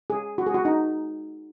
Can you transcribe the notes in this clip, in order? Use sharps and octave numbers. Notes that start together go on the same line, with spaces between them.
G#4
F#4
G#4
F#4
D#4